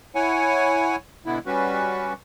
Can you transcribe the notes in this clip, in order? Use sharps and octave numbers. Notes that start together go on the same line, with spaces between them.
E4 C#5 F#5 G#5
B2 D3 B3 E4
G3 C#4 F#4 B4